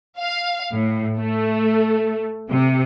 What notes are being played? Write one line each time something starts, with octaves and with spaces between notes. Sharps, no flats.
F5
A2
A3
C3